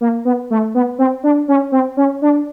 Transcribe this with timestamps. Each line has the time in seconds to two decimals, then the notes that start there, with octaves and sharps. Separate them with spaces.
0.01 A#3
0.25 B3
0.50 A3
0.75 B3
0.98 C4
1.24 D4
1.48 C#4
1.72 C4
1.97 C#4
2.22 D4